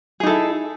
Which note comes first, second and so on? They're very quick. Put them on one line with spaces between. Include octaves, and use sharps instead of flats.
G#4 D#4 A4 E4